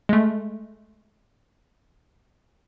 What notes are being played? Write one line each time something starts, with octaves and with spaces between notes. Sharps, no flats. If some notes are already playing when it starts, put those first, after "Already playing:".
G#3 A3